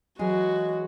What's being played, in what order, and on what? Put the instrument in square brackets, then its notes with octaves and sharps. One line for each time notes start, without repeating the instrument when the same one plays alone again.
[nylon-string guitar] E3 F#3 G#4 [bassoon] G#3 [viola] F#4